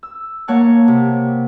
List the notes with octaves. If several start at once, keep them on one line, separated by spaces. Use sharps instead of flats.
E6
A#3 C#5 F#5 A5
C3